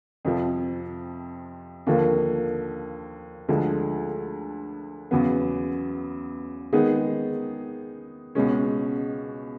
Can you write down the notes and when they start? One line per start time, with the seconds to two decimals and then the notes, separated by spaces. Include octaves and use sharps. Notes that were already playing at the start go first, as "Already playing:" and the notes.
0.25 F2 C3 F3
1.87 D#2 D3 F3 A#3
3.49 D2 D3 F3 G#3
5.11 E2 C#3 F#3 B3
6.73 D#3 G#3 B3 D#4 G#4
8.35 C#2 B2 G#3 C#4